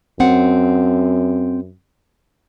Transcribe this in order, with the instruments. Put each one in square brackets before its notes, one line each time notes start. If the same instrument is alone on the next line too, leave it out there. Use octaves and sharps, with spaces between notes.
[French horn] F#2 [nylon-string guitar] C4 F#5